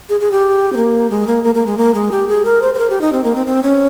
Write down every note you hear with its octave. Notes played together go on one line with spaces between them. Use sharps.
G#4
G#4
G4
C4
A#3
G#3
A#3
A#3
A#3
G#3
A#3
G#3
G4
G#4
A#4
C5
C5
A#4
G4
D#4
C4
A#3
C4
C4
C#4